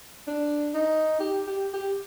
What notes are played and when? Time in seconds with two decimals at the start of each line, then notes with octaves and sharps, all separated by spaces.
0.28 D4
0.74 D#4
1.21 G4
1.47 G4
1.74 G4